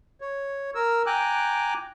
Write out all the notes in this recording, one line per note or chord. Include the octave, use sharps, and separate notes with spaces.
C#5
A#4 E6
G5 G#5 A#5 D6 F#6